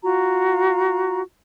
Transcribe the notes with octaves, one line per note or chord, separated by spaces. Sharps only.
F4 F#4 A#5